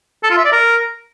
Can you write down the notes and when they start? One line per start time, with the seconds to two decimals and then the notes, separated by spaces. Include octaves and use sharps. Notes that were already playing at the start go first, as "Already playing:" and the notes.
0.23 A4
0.30 F4
0.38 E5
0.45 D5
0.52 A#4